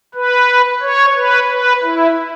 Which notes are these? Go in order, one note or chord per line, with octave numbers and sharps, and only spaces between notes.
B4
C#5
B4
B4
E4